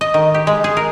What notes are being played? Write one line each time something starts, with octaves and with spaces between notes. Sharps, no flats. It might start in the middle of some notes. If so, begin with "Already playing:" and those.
D#5
D#3
G4
G#3
G#4
A#4